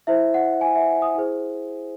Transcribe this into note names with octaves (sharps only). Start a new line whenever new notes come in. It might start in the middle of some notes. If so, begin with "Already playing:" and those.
E4 C5 E5
F#5
G#5
E5
D#6
E4 G#4 C5